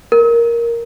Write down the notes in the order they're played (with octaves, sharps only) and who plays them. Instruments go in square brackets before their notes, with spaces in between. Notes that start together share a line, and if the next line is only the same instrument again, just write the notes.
[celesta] A#4